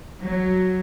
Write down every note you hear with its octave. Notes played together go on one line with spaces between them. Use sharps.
F#3